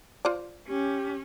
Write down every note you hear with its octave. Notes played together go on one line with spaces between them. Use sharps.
F4 C5 D5
C#4 G4